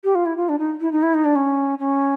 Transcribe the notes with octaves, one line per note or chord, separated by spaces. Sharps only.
G4
F4
E4
F4
D4
D#4
E4
D#4
E4
D#4
D4
C#4
C#4